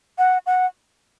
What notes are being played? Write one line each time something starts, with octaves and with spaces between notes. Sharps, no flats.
F#5
F#5